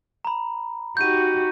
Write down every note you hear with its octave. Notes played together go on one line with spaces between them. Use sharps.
A#5 B5
D#4 F#4 G4 G6 D#7